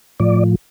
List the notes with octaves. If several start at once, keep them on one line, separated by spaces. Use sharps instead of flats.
A2 F3 D5